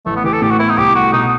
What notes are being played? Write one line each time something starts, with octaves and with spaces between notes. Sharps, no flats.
A1 A3
B3
E3 G4
A4
A2 G4
F#4
B3 E4
D#4
C2 G4
A3 F#4
B2 D#4